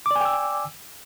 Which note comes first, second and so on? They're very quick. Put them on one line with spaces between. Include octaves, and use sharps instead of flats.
D6 D5 G#5 G5 E6